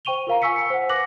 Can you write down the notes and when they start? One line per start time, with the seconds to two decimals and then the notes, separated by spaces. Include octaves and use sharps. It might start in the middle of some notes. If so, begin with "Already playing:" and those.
0.05 C5 G5 C#6 D#7 F7 G7
0.27 F4 A#4 F5 A#5
0.42 F5 G#5 C#6 E6 B6 C#7
0.56 C#7
0.70 C5 F#5
0.89 B4 D6 F#6 A#6 F#7